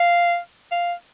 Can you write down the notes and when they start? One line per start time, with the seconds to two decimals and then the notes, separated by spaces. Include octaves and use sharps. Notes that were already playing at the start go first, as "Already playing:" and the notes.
Already playing: F5
0.72 F5